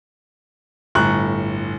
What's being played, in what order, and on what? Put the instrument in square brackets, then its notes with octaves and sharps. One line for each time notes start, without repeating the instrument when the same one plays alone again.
[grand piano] G1 A2 A#5 C#6 F#6